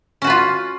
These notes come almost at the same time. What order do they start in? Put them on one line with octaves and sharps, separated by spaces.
C#4 F#4 B4 F4